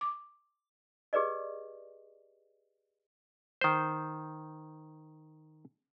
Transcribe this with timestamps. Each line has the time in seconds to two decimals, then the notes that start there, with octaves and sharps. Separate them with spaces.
0.01 D6
1.13 G4 G#4 B4 D5 D#5
3.61 D#3 C5